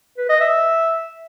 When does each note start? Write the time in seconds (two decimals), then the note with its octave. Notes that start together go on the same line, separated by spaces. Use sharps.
0.18 B4
0.29 D#5
0.41 E5